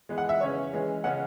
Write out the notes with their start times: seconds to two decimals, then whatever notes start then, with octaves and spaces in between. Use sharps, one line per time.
0.09 E3 G#3 B3
0.18 F#5
0.29 E5
0.41 C#3 E3 C#4 C#5
0.73 E3 G#3 C#4
1.04 C#3 G#3 C#4 F#5